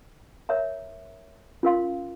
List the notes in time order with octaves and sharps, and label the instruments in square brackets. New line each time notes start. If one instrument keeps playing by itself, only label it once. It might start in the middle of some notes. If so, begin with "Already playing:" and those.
[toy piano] A#4 C#5 E5 A#5
C#4 F4 A#4 F5 C6